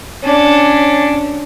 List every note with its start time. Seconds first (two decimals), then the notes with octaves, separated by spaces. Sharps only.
0.23 C#4 D4